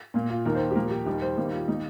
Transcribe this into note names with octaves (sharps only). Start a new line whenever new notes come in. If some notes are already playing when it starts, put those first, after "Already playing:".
A#2 A#3
F4
D#2 D#3 A#3 A#4
C5
G4
A#2 F3 A#3 A#4
G4
D#2 D#3 G3
C5
D#2 D#3 G3 A#3
F4
D#3 A#3 D#4